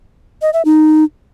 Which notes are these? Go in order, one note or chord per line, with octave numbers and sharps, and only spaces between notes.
D#5
E5
D#4